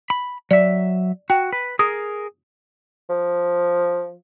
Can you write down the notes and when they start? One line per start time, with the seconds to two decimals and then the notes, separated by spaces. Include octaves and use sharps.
0.10 B5
0.51 F#3 D5 E5
1.30 F#4 G5
1.53 B4
1.79 G#4 A#4 D#6
3.09 F3